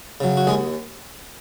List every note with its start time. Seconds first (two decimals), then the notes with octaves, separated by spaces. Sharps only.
0.20 C#3 F#3
0.37 F#4
0.47 D#2 G#3 G#4